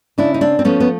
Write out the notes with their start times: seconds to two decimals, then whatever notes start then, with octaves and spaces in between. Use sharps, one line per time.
0.18 C#3 D4 E4
0.34 D#4
0.41 C4 D4
0.59 C4
0.65 F3 A3 B3 C#4
0.80 B3